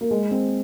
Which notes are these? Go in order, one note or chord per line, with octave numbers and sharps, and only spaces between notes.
A#3
G#3
C4